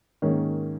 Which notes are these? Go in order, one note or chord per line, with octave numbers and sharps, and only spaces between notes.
G#2 D#3 A#3 C#4